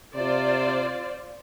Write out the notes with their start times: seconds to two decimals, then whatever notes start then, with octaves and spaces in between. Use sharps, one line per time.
0.15 C3 F4 C5 D5